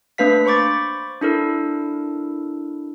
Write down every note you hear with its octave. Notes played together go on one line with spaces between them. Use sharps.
A3 A#3 D4 B4 F5 B6
C5 B5 C#6 D6 A6
D4 E4 A4 A#4